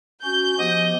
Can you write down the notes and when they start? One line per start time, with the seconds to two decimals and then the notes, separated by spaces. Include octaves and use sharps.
0.24 C#4 F#4 G6
0.59 F3 B3 G4 D#5